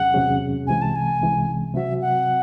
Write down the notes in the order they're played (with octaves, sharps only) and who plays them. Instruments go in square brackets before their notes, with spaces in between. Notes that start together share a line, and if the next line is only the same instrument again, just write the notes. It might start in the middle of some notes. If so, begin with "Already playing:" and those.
Already playing: [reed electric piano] E2 C3 F#3 C#4 G#4 [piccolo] F#5
[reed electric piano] E2 C3 F#3 C#4 G#4
[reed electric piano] C2 C3 E3 G#3 [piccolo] G#5
[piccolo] A5
G#5
[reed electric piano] C2 C3 E3 G#3
[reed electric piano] C3 F#3 C4 F#4 [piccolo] E5
[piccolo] F#5